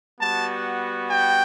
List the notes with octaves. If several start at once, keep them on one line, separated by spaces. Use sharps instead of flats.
G3 B3 F#4 A5
G5